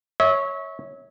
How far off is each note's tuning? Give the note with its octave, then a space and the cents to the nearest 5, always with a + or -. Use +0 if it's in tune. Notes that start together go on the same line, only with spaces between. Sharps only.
C#5 +0 E5 -35